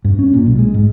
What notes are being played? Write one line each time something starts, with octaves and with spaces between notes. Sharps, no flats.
G2
C#4
A#2
B1
G#3
G#2